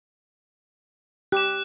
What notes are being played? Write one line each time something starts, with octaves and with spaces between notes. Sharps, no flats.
G4 F#6 E7